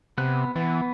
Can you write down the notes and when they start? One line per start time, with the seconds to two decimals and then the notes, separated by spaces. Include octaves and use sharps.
0.18 C3 B3 F#6
0.56 E3 B3